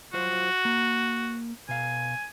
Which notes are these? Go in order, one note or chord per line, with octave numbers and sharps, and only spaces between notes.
F#3 F4 F#4 C5
A#3
B2 F5 G#5